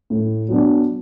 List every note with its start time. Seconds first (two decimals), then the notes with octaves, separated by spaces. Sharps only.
0.10 A2
0.49 F#3 B3 D4